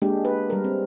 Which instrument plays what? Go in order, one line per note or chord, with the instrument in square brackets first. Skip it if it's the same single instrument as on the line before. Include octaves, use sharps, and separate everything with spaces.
[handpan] G#3 A#3 D4 G4
B4
G3 A#4
C4